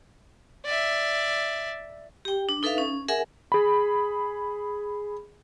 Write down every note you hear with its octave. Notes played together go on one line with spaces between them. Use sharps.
D5 E5
G4 G5
D4
D#4 A4 B4 E5 F5
C#4
G#4 A#4 E5 F#5 G#5
G#4 B5